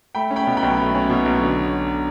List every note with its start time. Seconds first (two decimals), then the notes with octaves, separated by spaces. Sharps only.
0.15 A3 G5 B5
0.31 C#4
0.36 G5 B5
0.47 B2
0.57 G5 B5
0.62 B1
0.78 A3
0.94 C#4
1.10 B2
1.26 B1
1.42 D3